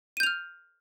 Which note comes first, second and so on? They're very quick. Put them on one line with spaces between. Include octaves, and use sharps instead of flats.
D#7 G6 F7 F6